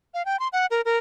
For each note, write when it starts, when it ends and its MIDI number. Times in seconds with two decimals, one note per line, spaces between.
0.14 0.25 77
0.25 0.39 79
0.39 0.48 84
0.53 0.66 78
0.71 0.81 70
0.85 0.97 70